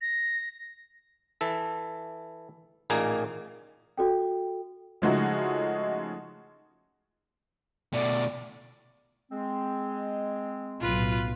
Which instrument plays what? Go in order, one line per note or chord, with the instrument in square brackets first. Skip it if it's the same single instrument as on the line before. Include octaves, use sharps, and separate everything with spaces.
[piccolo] A#6
[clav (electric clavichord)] E3 A4
A1 A#2 A#3 D#4 G#4
[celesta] F#4 A4 G5
[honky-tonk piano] C#3 F3 G#3 A3 D#4 F#4
[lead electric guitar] B2 A3 [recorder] D5
[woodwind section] G#3 C4
[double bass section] B1 A2 [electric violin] F4 B4